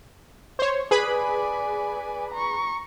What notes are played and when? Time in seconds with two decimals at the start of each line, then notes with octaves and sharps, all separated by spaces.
0.59 C5 C#5
0.91 G#4 B4 D5 G#5 B5
2.31 A#5 C#6